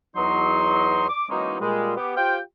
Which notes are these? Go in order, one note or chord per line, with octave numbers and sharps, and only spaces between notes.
E2 F#3 D#4 C6
D6
E3 F#3 G#3 A#3 C#4 D#4
A#2 G3 G#3
B3 G4
F4 G4 C5 F5 G5